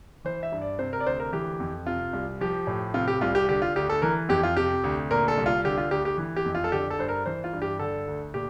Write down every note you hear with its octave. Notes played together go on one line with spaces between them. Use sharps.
E3 C5
E5
G2
D5
C3 C5
A#4
D5
D2 C5
A#4
E3 G4
F2
C3 F4
C2
F3 G4
A2
C3 F4
G4
C2 F4
G4
D3 G4
F4
D2 G4
A4
E3 A#4
F2 G4
F4
C3 G4
D2
A#2 A#4
A4
C2
F4
D3 G4
F4
D2 G4
G4
E3
G4
F2
F4
A4
D3 G4
A4
G2 C5
A#4
E3 C5
F4
G2
G4
D3 A4
D2
A#2 G4